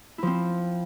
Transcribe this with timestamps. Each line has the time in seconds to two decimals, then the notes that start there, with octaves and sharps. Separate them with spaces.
0.18 E4
0.23 F3
0.27 C4